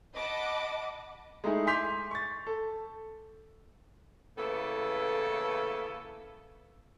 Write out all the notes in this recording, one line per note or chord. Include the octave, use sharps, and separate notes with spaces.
D#5 F#5 A5 B5 D6
G#3 A3 D#4 E4 G#4
G#5 C6 D6 G6 B6 F7
C#6 A6
A4
A2 C#3 E3 A#3 B3 A4